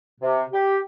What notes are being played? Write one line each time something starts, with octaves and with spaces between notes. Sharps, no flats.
C3
G4